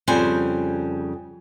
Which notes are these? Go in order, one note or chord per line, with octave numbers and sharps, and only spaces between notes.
F2 C#3 G3 C5 G#5